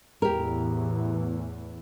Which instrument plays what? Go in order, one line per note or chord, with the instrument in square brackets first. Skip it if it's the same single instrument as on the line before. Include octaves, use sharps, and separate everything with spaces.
[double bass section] E2 A2 E3 [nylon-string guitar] G4 A#4